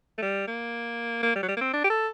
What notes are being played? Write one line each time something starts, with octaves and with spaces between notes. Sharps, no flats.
A3
G3
A#3
A#3
G3
F#3
G3
A#3
C4
D4
G4
A4